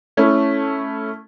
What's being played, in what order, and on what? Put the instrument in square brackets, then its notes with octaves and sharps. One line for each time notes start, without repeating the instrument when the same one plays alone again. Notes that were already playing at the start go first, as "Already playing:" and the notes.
[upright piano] A3 C#4 E4